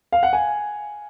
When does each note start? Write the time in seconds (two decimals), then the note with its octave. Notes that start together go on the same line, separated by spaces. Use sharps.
0.13 F5
0.23 F#5
0.33 G#5